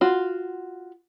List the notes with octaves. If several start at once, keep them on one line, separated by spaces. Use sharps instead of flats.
F4 F#4